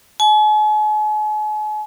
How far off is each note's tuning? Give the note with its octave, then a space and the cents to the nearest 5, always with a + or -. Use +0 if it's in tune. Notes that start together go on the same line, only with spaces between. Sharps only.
G#5 +45